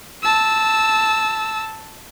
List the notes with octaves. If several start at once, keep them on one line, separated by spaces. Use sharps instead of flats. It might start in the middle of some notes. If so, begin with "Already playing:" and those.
A5 E6